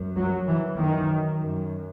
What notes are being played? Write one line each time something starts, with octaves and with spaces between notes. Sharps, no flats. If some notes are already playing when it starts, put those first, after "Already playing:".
Already playing: F#2
F#3
E3
F#2 D#3
F#2